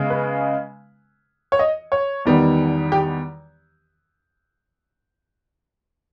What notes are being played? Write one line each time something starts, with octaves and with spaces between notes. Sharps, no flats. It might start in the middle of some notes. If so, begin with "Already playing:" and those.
Already playing: C#3 G#3 B3
B4
C#5
D#5
C#5
E2 D#3 G3 B3
G4